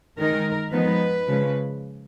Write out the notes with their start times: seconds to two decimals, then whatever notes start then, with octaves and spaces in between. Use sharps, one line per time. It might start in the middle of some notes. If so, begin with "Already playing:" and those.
0.18 D#3 G#3 D#4 A#4
0.71 F3 G#3 B3 D#4 B4
1.26 C#3 F3 G#3